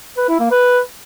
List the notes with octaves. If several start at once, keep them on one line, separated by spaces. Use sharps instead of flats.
B4
E4
A#3
B4